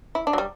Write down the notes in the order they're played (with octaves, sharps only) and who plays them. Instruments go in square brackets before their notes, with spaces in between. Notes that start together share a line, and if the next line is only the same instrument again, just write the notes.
[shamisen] E4
D4
F#3
G3